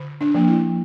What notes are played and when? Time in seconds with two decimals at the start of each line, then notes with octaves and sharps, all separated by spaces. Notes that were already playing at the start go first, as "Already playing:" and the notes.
Already playing: D3
0.21 D4
0.34 F3 A#3
0.48 E4